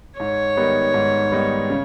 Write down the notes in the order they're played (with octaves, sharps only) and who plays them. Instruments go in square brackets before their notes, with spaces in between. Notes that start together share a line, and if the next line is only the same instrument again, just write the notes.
[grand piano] G#2 [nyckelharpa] C#5
[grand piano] D#3 G3 B3 D#4
G#2
D#3 G3 B3 D#4
C#3